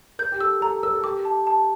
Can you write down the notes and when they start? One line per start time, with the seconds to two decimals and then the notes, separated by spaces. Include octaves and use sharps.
0.19 A#4 G6
0.32 G4
0.41 A4 E6
0.61 A4 A#5
0.83 A#4 E6
0.94 A4
1.04 G4 D6
1.25 A5
1.47 A5